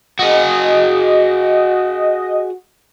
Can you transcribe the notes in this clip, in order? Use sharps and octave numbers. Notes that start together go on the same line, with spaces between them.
F#4 G#4 D#5